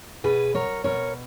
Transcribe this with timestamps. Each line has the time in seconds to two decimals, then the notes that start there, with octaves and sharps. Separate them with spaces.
0.24 B2 G#4 B4
0.54 F#3 A#4 C#5
0.84 B2 A#4 C#5